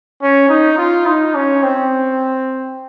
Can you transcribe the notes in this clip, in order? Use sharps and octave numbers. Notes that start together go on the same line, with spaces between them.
C#4
D#4
F4
D#4
C#4
C4